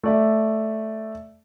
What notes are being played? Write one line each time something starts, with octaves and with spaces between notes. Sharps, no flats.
A3 D5 E5